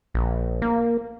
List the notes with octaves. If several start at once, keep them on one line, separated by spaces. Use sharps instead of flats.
A#1
A#3